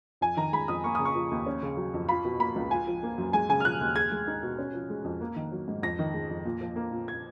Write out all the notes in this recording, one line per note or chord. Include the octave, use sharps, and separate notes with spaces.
F2 G#5
D#3 A#5
G#3 B5
F2 D#6
A#3 C#6
C#3 D#6
C#6
F3
D#2
C#4
C#3
F#3
F2
F4 B5
B2
A#3 B5
C#2
F4 G#5
F3
A#3
F#2
G#3 G#5
C#3 G#5
F6
F3 F#6
D#2
G#4 G#6
G#3
D#4
B2
C#4
F3
G#3
F2
A#3
D#3
F#3
G#2
F2 A#6
D#3
G#3
F2
A#2
F3
A#3
A#2
G#6